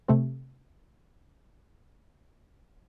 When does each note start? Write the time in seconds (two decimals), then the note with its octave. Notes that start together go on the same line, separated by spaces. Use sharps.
0.08 C3 A3 C4